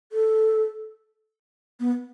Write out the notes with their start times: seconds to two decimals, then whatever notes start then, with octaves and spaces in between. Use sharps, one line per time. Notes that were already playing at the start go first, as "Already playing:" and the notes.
0.12 A4
1.80 B3